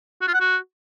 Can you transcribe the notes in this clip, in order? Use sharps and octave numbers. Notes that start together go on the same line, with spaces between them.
F#4
F4
F#5
F#4